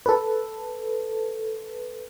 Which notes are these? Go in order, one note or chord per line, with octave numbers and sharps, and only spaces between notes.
A4 B4